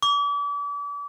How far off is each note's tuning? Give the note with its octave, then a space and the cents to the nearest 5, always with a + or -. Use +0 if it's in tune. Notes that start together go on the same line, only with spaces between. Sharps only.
D6 -35